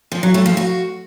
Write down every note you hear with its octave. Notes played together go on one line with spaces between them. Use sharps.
F3
F#3
A3
F3
F#4